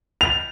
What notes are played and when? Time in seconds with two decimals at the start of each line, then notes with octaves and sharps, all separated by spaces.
0.21 F7